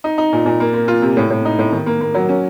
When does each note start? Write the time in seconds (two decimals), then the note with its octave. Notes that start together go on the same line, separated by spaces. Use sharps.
0.04 D#4
0.18 D#4
0.33 A#2
0.46 A#2
0.60 A#3
0.74 A#3
0.88 F4
1.02 C3
1.17 A2
1.30 A2
1.45 D#4
1.59 A2
1.72 D#3
1.86 A#3
2.01 A#3
2.15 F#3
2.29 C#4